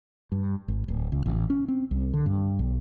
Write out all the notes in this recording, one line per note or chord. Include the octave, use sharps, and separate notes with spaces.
G2
G#1
D1
C#2
A1
C#4
C4
C2
D3
G2
B1